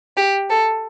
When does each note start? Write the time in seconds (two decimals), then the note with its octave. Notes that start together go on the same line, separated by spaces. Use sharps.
0.17 G4
0.50 A4